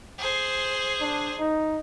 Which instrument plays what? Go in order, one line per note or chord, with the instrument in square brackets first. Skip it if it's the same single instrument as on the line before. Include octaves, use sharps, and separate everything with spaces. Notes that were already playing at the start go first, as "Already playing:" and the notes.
[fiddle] G#4 C5
[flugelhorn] D4
D#4